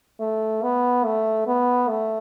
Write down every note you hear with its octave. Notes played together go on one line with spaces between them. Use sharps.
A3
B3
A3
B3
A3